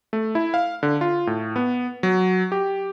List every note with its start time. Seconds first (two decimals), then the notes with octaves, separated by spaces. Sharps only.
0.13 A3
0.35 E4
0.54 F5
0.83 D3
1.01 F4
1.27 A2
1.56 B3
2.03 F#3
2.52 G4